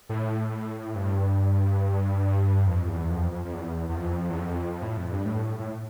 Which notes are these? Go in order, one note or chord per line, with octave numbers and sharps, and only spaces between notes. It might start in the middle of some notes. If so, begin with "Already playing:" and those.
A2
G2
F2
E2
F2
F2
F2
E2
E2
F2
E2
F2
A2
F2
G2
A2
A2